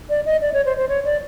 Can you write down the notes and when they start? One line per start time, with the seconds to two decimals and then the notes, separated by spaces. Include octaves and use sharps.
0.10 D5
0.26 D#5
0.41 D5
0.53 C#5
0.66 C5
0.77 C5
0.89 C#5
1.05 D5